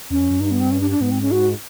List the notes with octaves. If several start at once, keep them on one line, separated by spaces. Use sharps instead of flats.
E2 C#4
F2
F#2
G2 D#4
B3
C4
C#4
D4
D4
G#2 B3
C4
C#4
F#4